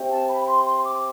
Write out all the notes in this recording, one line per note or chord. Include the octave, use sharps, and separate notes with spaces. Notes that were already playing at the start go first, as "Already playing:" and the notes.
Already playing: C4 G4 C5 E5 G5
A5
B5
C6
C6
D6